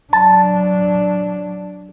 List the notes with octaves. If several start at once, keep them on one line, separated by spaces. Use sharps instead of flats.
F#3 D4 A5